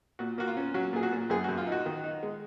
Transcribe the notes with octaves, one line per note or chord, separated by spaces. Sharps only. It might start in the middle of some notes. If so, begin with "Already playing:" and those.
A#2 F#4
A#3 F#4
F4
C#4
F#3 F#4
A#2 G#4
F#4
A#2
F#2 G#4
F#4
F#2
F4
D#4
F#4
D#3
D#4
G#3